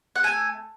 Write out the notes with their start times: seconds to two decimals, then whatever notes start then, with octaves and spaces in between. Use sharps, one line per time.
0.16 F#5
0.23 A3 G#5